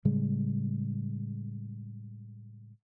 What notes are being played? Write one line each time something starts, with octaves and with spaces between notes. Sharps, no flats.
A2 C#3 G3 G#3